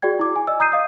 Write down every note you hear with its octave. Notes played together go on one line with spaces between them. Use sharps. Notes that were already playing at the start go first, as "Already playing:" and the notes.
F#4 G#4 D5 G5 G#6
E4 D6
G#5
D5 D#5 E6
A#5 D#6 G6 C7 D#7
D#5 F5 D#6